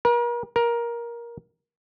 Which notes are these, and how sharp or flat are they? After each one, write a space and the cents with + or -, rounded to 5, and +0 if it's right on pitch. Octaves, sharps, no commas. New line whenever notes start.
A#4 +40
A#4 +15